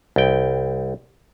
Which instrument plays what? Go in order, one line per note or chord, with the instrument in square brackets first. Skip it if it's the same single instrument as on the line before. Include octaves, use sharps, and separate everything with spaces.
[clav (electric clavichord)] C2 G5